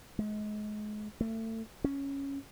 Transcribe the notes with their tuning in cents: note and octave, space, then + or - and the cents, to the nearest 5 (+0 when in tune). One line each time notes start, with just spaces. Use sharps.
G#3 +30
A3 +30
C#4 +0